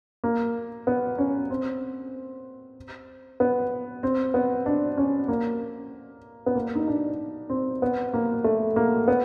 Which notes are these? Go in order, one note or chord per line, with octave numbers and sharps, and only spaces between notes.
A#3
B3
C#4
C4
B3
C4
B3
D4
C#4
A#3
B3
A#3
D#4
D4
C4
B3
A#3
A3
A#3
B3